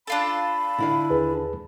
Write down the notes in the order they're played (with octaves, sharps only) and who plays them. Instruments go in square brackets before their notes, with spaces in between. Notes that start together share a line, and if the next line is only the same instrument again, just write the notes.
[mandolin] D4 F4 A4 [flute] B5
[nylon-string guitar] D3 E4 F5
[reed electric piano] D#2 G#4 B4